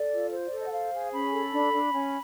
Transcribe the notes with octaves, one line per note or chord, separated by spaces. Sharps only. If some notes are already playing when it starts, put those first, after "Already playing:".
Already playing: A4 D5
F4
C5
D5
A4
D#5
F#5
C5 F5
G#4
C#4 B5
A4
D4
D4
C#4